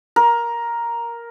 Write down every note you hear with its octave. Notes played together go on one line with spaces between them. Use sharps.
A#4